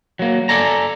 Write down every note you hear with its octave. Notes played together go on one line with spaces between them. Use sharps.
F#3 A#3
A4 D5 G#5 A#5